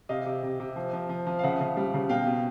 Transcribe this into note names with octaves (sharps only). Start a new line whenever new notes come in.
C3 D#5 F5
C3
C3
C3
F3
F3
F3
F3
F5
C#3 E5 F#5
C#3
G3
C#3
B2 F5 G5
B2